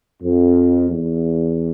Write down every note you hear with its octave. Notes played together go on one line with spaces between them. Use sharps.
F2
E2